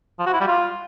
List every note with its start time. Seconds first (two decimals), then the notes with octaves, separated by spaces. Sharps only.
0.19 F3
0.26 F#4
0.33 E4
0.40 G3
0.47 F4